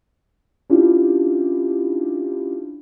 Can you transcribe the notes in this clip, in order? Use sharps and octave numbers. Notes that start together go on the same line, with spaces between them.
C#4 D4 E4 F4 G4